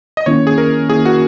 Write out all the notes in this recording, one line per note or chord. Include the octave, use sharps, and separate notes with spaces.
D#5
D#3 A#3 C#4 E4 C#5
G#4
A#4
D#3 A#3 C#4 E4 G#4
F#4